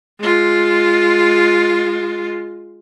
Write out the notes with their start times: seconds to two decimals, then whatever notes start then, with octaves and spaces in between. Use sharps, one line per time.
0.20 G#3 F4